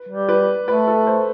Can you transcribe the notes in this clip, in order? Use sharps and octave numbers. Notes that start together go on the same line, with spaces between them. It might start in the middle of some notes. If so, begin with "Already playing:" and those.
Already playing: B4
G3
B4
A3 B4
A4
C5